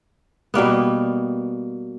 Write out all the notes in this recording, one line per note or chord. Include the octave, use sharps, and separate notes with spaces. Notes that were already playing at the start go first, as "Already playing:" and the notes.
B2 G3 A#3 B3